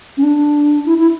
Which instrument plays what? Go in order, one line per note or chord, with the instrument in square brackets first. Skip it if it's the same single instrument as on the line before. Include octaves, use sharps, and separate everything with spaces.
[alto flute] C#4
D4
E4
E4